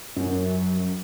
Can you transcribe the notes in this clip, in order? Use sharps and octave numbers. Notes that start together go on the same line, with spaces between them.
F#2